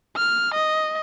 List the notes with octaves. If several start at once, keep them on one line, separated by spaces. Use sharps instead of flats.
F6
D#5